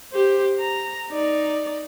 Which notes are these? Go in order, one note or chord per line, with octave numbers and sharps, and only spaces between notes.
G4 C5
A#5
D#4 D5